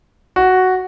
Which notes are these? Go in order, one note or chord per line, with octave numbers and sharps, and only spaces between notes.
F#4